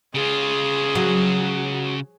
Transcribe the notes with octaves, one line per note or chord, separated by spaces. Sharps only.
C#3 F4 G#4
F#3